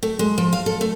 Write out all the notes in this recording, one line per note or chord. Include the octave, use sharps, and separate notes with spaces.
A3
G#3
F3
F5
A4
A3